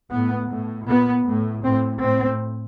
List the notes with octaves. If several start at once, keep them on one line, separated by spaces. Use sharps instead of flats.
A2 B3
A2
A#2 B3
A2
A2 C4
A2 C4